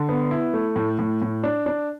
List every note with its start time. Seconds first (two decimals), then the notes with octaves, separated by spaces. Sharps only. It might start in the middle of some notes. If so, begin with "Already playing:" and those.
Already playing: D3
0.09 B3
0.31 E4
0.54 A3
0.76 A2
0.99 A2
1.22 A2
1.44 D4
1.66 D4